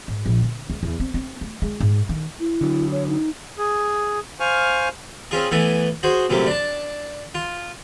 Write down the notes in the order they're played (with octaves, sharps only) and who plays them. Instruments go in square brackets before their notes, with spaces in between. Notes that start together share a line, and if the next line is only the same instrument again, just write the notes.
[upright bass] G#2
A#1
D3
C#2
E2
C4
C4
A3
G#3
G#2
D#3
[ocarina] E4
[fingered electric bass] D3 F#3
[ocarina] C#5
D#4
[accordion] G#4
C5 F5 G#5 C#6 F6
[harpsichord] C4 C#4 F4 G#4
E3 A3 B3 A4 G#5
F#4 G#4 C5
A#1 F#2 C3 A3 A#3
D4 A5
F4